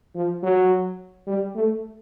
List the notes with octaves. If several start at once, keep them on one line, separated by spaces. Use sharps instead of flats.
F3
F#3
G3
A3